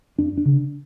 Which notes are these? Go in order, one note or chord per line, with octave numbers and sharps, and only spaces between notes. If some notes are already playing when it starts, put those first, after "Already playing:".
F2 D4
D4
C#3